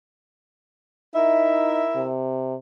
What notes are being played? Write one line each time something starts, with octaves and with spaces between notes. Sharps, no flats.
D#4 E4 A#4 E5
C3